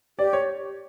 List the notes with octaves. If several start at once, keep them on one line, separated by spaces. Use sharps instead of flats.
G4 D5
C#5